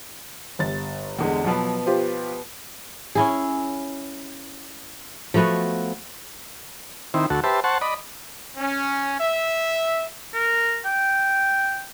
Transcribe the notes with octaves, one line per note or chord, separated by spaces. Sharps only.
G1 A6
E2 D3 G#3
B2 F3 F#3 B4
F4 G4 C5
C#4 E4 G#4
F3 A3 B3 F#4
D#3 C4 E4
D2 F#4 A4
G4 B4 C5 E5 A5
C5 F#5 A5 C#6
D5 D#5 B5
C#4
E5
A#4
G5